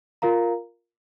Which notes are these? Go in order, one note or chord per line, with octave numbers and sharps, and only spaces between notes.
F4 A#4 F5 A#5